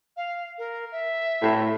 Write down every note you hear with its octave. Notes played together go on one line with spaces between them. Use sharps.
F5
A#4
E5
A2